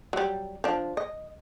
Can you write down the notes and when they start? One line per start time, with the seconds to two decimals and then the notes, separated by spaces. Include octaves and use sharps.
0.13 F#3 G3
0.64 F3 D4
0.97 D#5